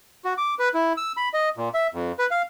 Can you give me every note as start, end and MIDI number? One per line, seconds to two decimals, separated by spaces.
0.25 0.34 66
0.38 0.54 86
0.59 0.69 71
0.74 0.93 64
0.97 1.12 88
1.17 1.29 83
1.34 1.49 75
1.57 1.69 46
1.74 1.87 76
1.94 2.12 41
2.19 2.26 71
2.31 2.42 77